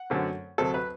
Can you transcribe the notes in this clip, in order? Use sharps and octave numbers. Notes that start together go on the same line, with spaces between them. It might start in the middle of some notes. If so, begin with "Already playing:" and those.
Already playing: F#5
F#2 D3 A3 C4
D2 C3 F#3 C4 A4
B4